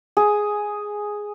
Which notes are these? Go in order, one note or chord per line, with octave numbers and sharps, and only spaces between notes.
G#4